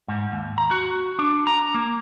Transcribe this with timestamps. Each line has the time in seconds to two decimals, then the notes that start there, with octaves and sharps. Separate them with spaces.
0.08 G#2
0.32 D#2
0.58 A#5
0.71 F#4
1.19 D4
1.47 A#5
1.74 A#3